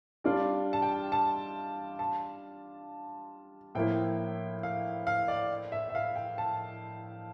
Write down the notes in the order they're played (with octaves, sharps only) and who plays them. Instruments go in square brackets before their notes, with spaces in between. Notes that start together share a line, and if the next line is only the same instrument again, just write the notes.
[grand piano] G3 D4 F4 [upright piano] D5
[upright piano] A5
G5
A5
A5
[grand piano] A2 F3 A#3 E4 [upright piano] G5
[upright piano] F5
F5
D5
E5
E5
F5
G5
A5